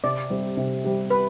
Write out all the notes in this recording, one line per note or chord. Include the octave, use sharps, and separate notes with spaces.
C3 D5
G3 C4 G4
C3
G3 C4 G4
B4